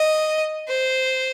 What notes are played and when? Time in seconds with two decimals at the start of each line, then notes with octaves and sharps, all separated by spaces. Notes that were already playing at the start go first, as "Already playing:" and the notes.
Already playing: D#5
0.68 C5